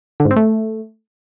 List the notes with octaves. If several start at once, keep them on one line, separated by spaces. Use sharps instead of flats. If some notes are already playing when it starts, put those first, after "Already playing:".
D3
G#2
C4
A3